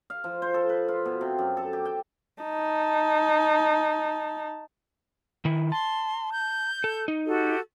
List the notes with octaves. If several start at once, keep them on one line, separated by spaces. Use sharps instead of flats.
F5
F3
C5
A4
B4
F4
B2
C3
F#2
A4
G4
G5
D#4 A5
D#3 E4
A5 C6
G6
A4
D#4
F#4 G4 A4